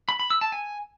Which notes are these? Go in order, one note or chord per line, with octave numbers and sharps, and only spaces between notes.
B5
B5
E6
A5
G#5